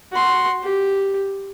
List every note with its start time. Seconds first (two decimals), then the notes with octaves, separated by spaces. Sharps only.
0.12 F#4 C6
0.63 G4